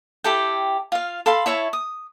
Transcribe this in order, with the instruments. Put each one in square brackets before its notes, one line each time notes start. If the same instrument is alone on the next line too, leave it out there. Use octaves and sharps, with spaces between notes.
[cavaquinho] E4 G4 A4 G5
F4 F5
A4 F5 B5 C6
E4 C#5 E5 A5
D#6